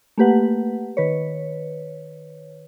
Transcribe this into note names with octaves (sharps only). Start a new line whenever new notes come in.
A3 A#3 G4 B4 F#5
D#3 B4 C#5